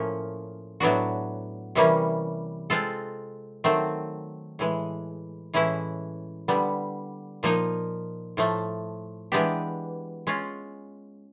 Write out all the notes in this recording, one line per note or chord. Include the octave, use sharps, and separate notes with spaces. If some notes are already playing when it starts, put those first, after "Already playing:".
Already playing: A2 F3 A#3 C#4
A2 F#3 B3 D4 F#4
C3 E3 G3 A#3 C#4
G#3 C4 F4 A4
D#3 F#3 A3 C4
A2 E3 G#3
A2 E3 G#3 C#4 E4
D3 G3 B3
A#2 F3 A#3 D#4
A2 F3 A3
E3 G#3 B3 D4 G4
G#3 C#4 F4